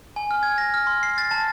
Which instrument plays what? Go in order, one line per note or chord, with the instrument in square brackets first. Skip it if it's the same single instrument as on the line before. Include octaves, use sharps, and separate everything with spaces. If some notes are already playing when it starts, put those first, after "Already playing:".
[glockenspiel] G#5
F6
G#6
A#6
F6
C6
C7
A6
A5